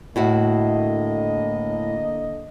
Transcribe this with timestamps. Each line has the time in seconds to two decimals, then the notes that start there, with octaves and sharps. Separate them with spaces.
0.16 A2 D3 A#3 E4 F#4 D#5